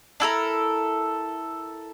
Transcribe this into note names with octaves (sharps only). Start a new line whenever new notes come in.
D4 E4 A4 A#4